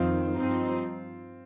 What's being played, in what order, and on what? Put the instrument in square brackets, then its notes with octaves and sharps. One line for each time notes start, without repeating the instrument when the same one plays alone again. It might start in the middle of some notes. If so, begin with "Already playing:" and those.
Already playing: [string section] F2 D#3 [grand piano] C4 F4
[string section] G2 F3 C4 D#4